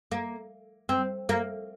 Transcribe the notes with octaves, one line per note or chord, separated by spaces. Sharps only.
A#3
C4
A#3